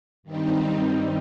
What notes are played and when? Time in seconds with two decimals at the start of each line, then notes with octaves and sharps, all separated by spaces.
0.23 G2 D#3 G3 C4 D#4